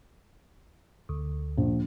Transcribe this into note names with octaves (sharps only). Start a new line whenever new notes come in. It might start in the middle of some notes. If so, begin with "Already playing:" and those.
D2
A#1